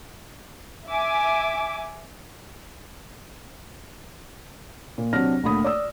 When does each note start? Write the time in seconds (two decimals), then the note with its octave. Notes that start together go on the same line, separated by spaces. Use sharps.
0.89 E5 G#5 D6
4.98 A#2
5.13 C3 F#3 C4 D4 F6 A#6
5.43 D2 A#2 A3 B5 D#6
5.64 D5 D#6 E6